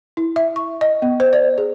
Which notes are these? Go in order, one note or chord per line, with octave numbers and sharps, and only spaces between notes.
E4
E5
C#6
D#5
B3
C5
D5
G#4